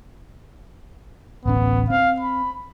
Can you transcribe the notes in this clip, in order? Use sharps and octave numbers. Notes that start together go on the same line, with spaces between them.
D1 A1 B3 C#4
C4 F5
B5